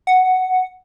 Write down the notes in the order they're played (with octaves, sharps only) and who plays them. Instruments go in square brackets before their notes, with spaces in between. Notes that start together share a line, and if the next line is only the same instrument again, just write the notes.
[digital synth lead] F#5